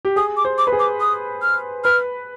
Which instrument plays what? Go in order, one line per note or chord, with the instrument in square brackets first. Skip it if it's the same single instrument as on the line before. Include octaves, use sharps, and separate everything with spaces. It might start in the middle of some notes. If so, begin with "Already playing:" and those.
[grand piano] G4
[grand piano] G#4 [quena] D#6
[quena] D6
[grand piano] C5
[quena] D6
[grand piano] B4
G#4
[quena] D6
D#6
F6
[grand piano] B4 [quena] F6